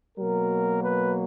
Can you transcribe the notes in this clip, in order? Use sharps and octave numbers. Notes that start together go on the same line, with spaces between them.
B2 F#3 A#3 A#4
B4